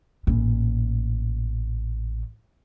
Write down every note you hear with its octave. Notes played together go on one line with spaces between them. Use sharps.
A1 A#2